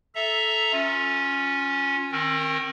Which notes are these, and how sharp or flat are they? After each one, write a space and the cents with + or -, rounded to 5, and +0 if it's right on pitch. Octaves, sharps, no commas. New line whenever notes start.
A4 -10 E5 +0 A#5 +0
C#4 +0 F4 +20
D#3 +0 C4 +35 A#4 +0